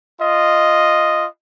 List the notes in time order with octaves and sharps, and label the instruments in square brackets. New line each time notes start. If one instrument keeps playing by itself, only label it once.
[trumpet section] F4 D#5